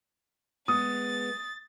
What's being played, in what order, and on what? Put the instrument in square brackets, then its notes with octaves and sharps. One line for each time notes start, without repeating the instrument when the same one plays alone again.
[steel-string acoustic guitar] G#3 B3 [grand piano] D#6 [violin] A6